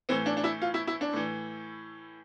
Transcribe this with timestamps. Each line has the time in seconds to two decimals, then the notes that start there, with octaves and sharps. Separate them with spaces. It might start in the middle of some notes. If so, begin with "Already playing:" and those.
0.09 A2 E3 C4
0.26 D4
0.37 D4
0.44 E4
0.62 F4
0.74 E4
0.87 E4
1.01 D4
1.13 A2 E3